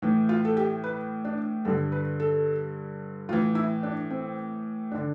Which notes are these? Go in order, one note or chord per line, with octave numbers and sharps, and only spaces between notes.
A2 E3
F4
A4
G4
B4
D4
G2 D3 A4
B4
A4
A2 E3 F4
E4
D4
C4
D3 D4